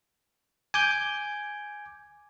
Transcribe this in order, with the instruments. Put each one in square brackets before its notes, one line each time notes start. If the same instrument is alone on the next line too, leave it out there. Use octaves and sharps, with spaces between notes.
[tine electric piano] G#5 D6 G6